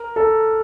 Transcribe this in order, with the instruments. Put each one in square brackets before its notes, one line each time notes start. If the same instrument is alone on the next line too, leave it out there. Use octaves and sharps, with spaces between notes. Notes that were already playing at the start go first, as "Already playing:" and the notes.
Already playing: [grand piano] A#4
A4